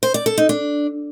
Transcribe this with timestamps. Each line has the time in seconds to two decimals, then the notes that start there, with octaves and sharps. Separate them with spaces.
0.03 C5
0.14 D5
0.26 A4
0.38 D#4
0.49 D4